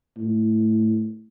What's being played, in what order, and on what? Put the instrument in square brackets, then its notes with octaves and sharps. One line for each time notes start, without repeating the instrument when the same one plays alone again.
[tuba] A2